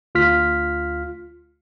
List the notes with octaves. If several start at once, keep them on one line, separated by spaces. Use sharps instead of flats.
D2 F4 F6 B6